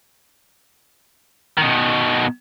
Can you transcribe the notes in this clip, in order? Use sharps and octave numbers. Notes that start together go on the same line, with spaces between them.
B2 D#3